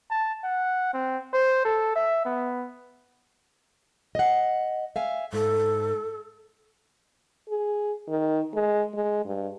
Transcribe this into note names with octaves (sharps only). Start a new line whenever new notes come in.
A5
F#5
C4
C5
A4
E5
B3
D#5 F#5
E5 F5 G#5
G#2 A4
G#4
D#3
G#3
G#3
G2